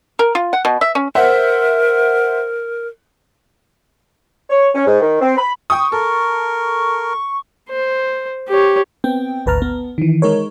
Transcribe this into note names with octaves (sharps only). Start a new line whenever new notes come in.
A#4
F4
F#5
B2
E5
C#4
A#4 C5 E5 F#5
C#5
C#4
G#2
D#3
C4
B5
G5 C#6 D#6
A4 A#4
C5
G4 C#5
B3 C4 G5
G#1 D2 B4 A5 A#5 F6
B3
D#3 E3
G#3 D#4 A#4 C#5